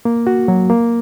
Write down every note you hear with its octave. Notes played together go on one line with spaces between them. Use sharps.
A#3
F#4
F#3
A#3